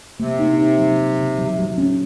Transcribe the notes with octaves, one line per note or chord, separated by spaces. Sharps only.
C3 A#3
D#4
D#4
F#3
F#3
C#3
F#3
F#3
C#4